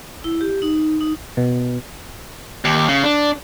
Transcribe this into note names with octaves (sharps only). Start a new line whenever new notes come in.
E4
G4
D#4
D#4
B2
D#2
C#3
D4